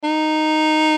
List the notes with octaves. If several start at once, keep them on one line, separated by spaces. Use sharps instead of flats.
D#4